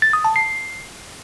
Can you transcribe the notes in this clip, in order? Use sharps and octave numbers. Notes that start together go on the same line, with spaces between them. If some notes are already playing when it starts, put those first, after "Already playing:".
A6
D#6
A5
C7